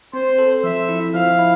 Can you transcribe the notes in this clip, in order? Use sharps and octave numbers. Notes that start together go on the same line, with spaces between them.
C4 C5
A4
F3 E5
E4
F3 F5
E4